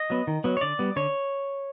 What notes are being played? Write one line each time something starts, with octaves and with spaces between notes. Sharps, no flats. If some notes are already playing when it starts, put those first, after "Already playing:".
Already playing: D#5
F#3 B3
D#3
F#3 B3
C#5
D3 D5
G3 B3
D3 C#5